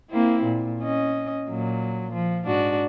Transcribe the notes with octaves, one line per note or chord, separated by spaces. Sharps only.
A#3 C4 E4
A#2
C#4 D#5
A#2 F#3
F3
G#2 D4 F#4